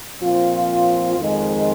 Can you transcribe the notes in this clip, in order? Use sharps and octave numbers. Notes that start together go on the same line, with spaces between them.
A#2 F3 C4 F4
F2 D#3 G#3